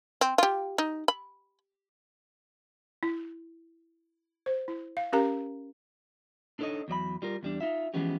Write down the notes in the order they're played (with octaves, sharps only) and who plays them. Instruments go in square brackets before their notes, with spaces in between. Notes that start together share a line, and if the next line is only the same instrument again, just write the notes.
[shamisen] C4
F4 G4
D#4
B5
[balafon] E4
C5
E4
F5
C#4 G4 A#4 F5 A#5
[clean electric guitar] D4 D#4 A4 B4 C#5 D#5
E2 F#3 D5 B5
G3 F4 A#4
E2 G3 D4
D#4 F4 E5
E3 F3 G#3 B3 C#4 G4